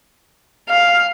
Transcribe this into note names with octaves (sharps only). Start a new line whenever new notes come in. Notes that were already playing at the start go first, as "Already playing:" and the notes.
F5